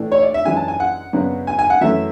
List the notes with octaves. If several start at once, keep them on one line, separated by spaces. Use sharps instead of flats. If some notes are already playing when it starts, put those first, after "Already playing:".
Already playing: A2 E3 A3 D4
C#5
D5
E5
F#2 E3 G#3 D4 G#5
A5
G#5
F#5
F#2 C#3 F#3 B3 D4
G#5
G#5
F#5
F#2 E3 A3 E5